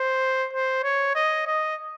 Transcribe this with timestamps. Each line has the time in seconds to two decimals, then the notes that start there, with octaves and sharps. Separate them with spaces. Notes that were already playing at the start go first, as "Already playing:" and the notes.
Already playing: C5
0.53 C5
0.84 C#5
1.16 D#5
1.47 D#5